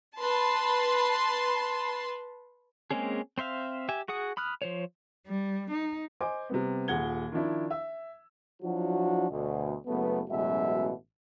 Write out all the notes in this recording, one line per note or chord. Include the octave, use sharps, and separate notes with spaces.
B4 A5 C6
G#3 A#3 C4 C#4 G#4
C4 C5 E5 F5
G4 E5 G#5
F#4 G#4 F#5 D#6
B5 D#6 F6 F#6
F3 C5 C#5
G3
D#4
C5 D#5 G#5 D6
C3 G3 B3
D#1 A#2 G#4 F#5 G#6 G7
D#3 F3 D4 E4
E5 E6
F3 F#3 D4 E4 F#4
D2 B2
F#1 F#3 A3 B3
A1 F#2 B2 G#3 F#4 E5